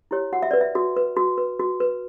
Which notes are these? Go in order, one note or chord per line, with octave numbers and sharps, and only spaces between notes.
E4 G4 C#5
F#4 F#5
E5
B4 D5
E5
F#4
B4
F#4
B4
F#4
B4